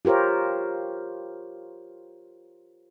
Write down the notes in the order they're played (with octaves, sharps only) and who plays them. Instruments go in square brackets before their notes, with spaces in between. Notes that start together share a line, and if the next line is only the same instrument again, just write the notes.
[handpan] F4 G4 A#4 C5 C#5